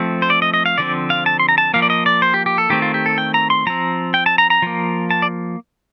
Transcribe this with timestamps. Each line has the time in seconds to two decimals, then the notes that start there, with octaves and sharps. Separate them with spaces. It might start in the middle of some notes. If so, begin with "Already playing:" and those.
Already playing: F3 A3 C4
0.22 C5
0.30 D5
0.42 D#5
0.54 D#5
0.66 F5
0.78 D3 F3 C4 D5
1.10 F5
1.26 A5
1.39 C6
1.49 A#5
1.58 A5
1.74 F3 A#3 F5
1.82 D5
1.90 D#5
2.06 D5
2.22 C5
2.34 G4
2.46 G4
2.58 A4
2.70 D#3 A3 C4 G4
2.82 F4
2.94 G4
3.06 A4
3.18 G5
3.34 A#5
3.50 C6
3.67 F3 C4 A#5
4.14 G5
4.26 A5
4.38 A#5
4.50 A#5
4.62 F3 A#3
5.11 A5
5.22 D5